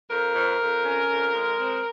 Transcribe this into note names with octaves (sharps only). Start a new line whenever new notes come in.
F2 A#4
F2
F2
C#4
F2
G#3
C4